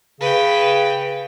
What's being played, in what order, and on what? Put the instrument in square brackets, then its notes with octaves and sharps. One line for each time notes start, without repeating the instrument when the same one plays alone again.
[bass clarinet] C#3 [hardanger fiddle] B4 G5